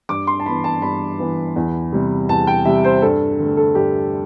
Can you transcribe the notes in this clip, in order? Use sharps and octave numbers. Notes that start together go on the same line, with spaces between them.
G2 D6
C6
A5
E3 B3 B5
A5
G2 B5
E3 B3
E2
C3 G3
E2 A5
G5
C3 G3 E5
C5
G2 A4
D3 A3
A4
G2 G4